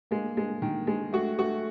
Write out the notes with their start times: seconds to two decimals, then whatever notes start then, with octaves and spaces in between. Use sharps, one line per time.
0.11 G#3 A#3
0.37 G#3
0.62 D#3
0.87 G#3
1.13 A3 F#4
1.38 A3 F#4